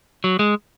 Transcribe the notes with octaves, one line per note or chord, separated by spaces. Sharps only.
F#3
G#3